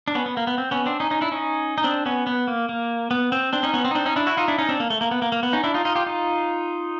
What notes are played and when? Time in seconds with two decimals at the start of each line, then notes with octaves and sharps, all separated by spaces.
0.08 D4
0.15 B3 C#4
0.26 B3
0.37 A#3
0.47 B3
0.58 C4
0.71 B3 C#4
0.86 C4 D4
1.00 C#4 D#4
1.11 C#4 D#4
1.21 D4 E4
1.31 C#4 D#4
1.78 D#4
1.84 C4 D4
2.06 B3 C#4
2.27 B3
2.48 A#3
2.69 A#3
3.11 B3
3.32 C4
3.53 C4 D4
3.63 C#4 D#4
3.74 B3 C#4
3.85 C4
3.91 D#4
3.95 C4 D4
4.06 C#4 D#4
4.16 D4 E4
4.27 E4 F#4
4.37 D#4 F4
4.48 D4 E4
4.58 C#4 D#4
4.69 C4 D4
4.80 A#3
4.90 A3
5.01 A#3
5.11 B3
5.22 A#3
5.32 A#3
5.43 B3
5.53 C#4 D#4
5.64 D4 E4
5.74 D#4 F4
5.85 D#4 F4
5.95 F4 G4
6.06 D#4 F4